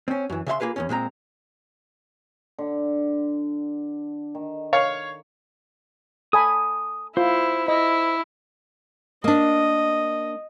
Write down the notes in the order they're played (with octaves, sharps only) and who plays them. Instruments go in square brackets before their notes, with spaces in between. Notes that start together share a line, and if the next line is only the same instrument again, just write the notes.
[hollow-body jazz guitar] C4 C#4
F#2 E3
C#3 E5 F5 C6
A#3 F4 G#4 B4 F5
E2 B2 C#4
A#2 G#3 C4 A#5
[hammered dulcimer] D3
D#3
[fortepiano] C#5 F5
[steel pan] A4 G#5 B5 [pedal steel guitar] D#6
[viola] E4 [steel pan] F4 [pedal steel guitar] C5
[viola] E4 [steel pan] D#5
[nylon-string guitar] A#3 D4 [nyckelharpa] D#5